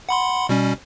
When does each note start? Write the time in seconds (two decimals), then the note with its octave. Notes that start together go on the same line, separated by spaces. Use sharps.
0.09 F#5 B5 C6
0.49 B2 G3 C#4